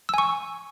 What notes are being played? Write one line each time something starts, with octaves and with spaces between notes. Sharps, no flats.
G#5 C#6 E6